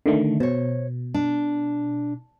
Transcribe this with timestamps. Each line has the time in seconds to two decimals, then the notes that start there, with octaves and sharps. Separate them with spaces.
0.06 D3 D#3 A3
0.40 B2 C5 C#5
1.14 D4